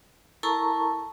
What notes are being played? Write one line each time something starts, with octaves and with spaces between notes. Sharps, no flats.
E4 A4 A#4 A5 A#5 C#6